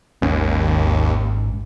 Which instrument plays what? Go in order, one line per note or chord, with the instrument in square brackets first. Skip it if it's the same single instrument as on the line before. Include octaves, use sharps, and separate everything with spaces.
[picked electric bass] G#1 G#2 C#4 [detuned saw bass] D#2